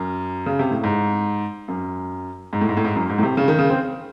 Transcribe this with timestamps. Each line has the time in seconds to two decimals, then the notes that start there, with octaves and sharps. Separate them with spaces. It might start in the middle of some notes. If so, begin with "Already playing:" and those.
Already playing: F#2
0.46 C#3
0.59 C3
0.71 A2
0.84 G#2
1.68 F#2
2.53 G#2
2.61 A2
2.69 G#2
2.77 A2
2.85 G#2
2.96 F#2
3.09 G#2
3.18 A2
3.23 C3
3.37 C#3
3.48 D#3
3.59 C#3
3.70 C4